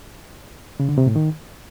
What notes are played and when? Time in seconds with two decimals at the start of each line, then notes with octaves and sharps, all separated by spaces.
0.80 C#3
0.89 D3
0.98 C3
1.07 A2
1.16 D#3